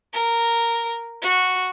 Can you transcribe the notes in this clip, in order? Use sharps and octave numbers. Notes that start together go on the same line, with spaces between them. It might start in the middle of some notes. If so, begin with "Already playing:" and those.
A#4
F#4